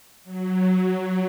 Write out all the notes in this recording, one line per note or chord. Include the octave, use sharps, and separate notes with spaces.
F#3